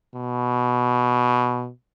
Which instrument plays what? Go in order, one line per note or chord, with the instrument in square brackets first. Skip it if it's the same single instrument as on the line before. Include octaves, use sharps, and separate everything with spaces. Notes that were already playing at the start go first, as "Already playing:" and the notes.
[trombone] B2